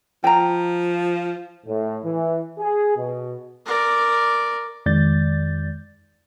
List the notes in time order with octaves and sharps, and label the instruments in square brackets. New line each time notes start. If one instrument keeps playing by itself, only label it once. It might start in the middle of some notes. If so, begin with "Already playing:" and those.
[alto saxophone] F3 [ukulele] G5 A#5
[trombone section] A2
E3
G#4
B2
[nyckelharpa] A#4 D5
[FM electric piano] F2 D#3 G#3 D5 G6 A6